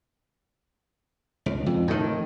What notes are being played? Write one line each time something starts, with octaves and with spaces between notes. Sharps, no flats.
C#2
F2
A2 D#3